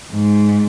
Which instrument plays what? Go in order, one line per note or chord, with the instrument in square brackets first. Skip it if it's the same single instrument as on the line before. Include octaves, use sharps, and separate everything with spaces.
[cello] G#2